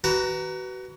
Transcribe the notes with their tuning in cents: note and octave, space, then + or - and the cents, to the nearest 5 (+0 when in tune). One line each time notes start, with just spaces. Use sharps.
F#4 +30 B4 +0 A#5 -10